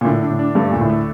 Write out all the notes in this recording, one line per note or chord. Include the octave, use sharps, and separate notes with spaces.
A#2
A2 D3
D4
A2
D4
G2 A3
D2 A#2
A2
A3